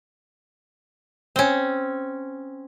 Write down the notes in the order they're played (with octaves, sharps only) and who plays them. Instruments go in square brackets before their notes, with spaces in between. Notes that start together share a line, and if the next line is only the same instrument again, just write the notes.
[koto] C4 C#4